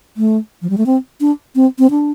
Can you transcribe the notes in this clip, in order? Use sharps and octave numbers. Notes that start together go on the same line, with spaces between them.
A3
F3
G3
A3
C4
D4
C4
C4
D4